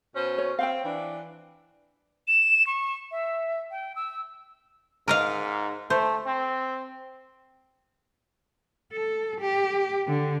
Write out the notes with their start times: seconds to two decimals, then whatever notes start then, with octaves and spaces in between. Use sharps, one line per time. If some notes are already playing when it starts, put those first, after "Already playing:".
0.16 B2 C#4 C5
0.38 C#5
0.59 C4 F5 G5
0.84 E3 D4
2.28 E7
2.67 C#6
3.11 E5
3.71 G5
3.96 E6
5.08 G#2 A#4 D#5 F5
5.90 A3 C5
6.26 C4
8.93 A4
9.40 G4
10.08 D3